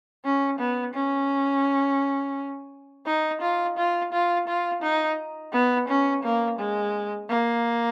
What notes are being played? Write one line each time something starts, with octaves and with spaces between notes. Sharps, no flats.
C#4
B3
C#4
D#4
F4
F4
F4
F4
D#4
B3
C#4
A#3
G#3
A#3